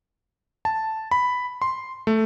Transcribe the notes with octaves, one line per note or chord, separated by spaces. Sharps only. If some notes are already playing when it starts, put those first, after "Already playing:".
A5
B5
C6
A3